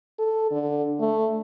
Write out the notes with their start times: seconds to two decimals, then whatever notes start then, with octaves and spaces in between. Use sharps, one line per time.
0.19 A4
0.51 D3
1.00 A3